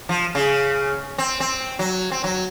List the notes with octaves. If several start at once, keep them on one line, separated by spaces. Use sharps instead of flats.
F3
C#3
C4
C4
F#3
C4
F#3